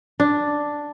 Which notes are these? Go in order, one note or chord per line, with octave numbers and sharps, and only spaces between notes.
D4